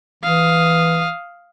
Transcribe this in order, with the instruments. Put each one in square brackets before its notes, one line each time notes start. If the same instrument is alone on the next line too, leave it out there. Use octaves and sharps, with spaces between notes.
[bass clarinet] E3 [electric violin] F5 D#6